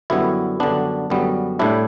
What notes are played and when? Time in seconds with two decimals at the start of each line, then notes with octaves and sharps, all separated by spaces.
0.10 F#2 D3 G3 B3 E4
0.60 F#2 D3 G3 B3 D4
1.10 F#2 D3 G3 B3
1.59 A2 G3 D4 E4